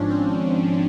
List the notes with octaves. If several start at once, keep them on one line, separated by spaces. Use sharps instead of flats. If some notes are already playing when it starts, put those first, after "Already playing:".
Already playing: G#1 G#2 F3 C#4 D4
C4